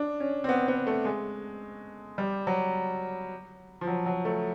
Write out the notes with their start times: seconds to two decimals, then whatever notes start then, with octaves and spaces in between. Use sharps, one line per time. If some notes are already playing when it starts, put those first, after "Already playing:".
Already playing: D4
0.20 C#4
0.44 C4
0.49 B3
0.68 B3
0.87 A3
1.05 G#3
2.18 G3
2.47 F#3
3.81 F3
3.87 F#3
4.06 F#3
4.25 A3